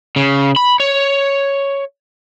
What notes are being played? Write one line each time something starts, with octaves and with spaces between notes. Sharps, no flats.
C#3
B5
C#5